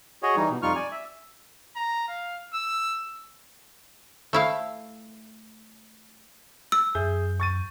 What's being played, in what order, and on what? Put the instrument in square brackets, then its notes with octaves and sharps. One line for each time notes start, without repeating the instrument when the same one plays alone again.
[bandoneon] F#4 G#4 C#5 D#5
E3 G3 D#4
B2
F2 G3 D#4 F4 C#6 F6
D5 G#5
E5
[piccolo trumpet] A#5
F5
E6
[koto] A3 E4 F5
[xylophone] E6
[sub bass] F#2 [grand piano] G#4 E5 G6
[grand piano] C#6 A6 D#7